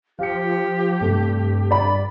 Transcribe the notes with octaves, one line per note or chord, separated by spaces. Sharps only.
F3 G4 F5 C#7
G2 C3 A3
D5 A#5 B5